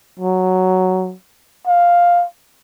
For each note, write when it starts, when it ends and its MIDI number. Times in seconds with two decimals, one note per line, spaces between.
0.19 1.14 54
1.67 2.25 77